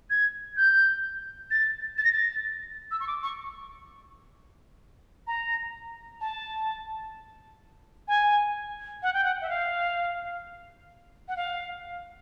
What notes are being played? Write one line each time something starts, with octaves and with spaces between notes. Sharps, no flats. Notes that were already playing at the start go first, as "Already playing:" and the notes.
G#6
G6
A6
A6
A#6
A6
E6
C#6
D6
C#6
A#5
A5
G#5
F#5
G5
F#5
E5
F5
F#5
F5